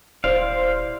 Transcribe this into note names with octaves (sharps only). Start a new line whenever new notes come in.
D#1 E4 G4 C5 D5 F5